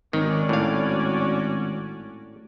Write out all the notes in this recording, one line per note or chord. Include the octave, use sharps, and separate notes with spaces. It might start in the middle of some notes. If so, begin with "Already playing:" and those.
G#1 D#3 C#4 F#4 D5
A2 F5